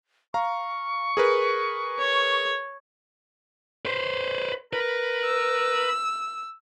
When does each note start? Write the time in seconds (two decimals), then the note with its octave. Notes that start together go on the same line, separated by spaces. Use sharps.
0.34 F5 A#5 C#6
1.17 G#4 A#4 B4
1.99 C#5
3.85 B4 C5
4.73 A#4 B4
5.24 E6